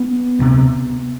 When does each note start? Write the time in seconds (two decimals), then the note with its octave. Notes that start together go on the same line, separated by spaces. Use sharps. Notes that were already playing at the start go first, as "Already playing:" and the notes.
Already playing: B3
0.39 D2 C3